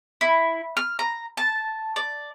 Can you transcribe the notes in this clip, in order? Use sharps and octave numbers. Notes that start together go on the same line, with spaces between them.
E4
F6
A#5
A5
D5